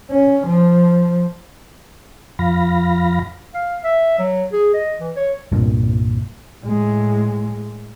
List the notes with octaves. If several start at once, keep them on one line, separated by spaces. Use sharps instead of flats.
C#4
F3
F2 F3 F5 B5 A#6
F5
E5
F#3
G#4
D#5
E3
C#5
C2 G2 A#2
A2 G#3